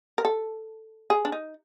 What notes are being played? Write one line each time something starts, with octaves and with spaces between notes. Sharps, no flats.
A#4
A4
G#4
D4
D#4